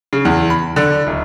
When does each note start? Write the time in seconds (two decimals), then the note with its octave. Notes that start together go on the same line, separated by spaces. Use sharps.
0.13 C#3
0.25 E2
0.50 B5
0.76 D3
1.07 D1